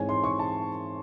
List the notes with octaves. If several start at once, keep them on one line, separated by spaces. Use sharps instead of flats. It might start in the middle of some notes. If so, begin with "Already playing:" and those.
Already playing: G#2 E3 G#3 C4 C#5 G#5
C6
C#6
A5